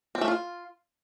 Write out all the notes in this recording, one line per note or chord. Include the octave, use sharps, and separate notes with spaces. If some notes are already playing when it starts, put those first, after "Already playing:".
C4
A3
F4